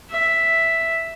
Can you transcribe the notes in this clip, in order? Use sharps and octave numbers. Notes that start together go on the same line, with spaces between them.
E5